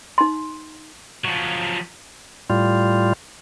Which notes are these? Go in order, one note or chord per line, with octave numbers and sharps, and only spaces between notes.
D#4 C6
F3 F#3
A2 G3 F4